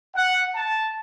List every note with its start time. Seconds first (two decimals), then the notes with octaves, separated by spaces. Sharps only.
0.15 F#5
0.55 A5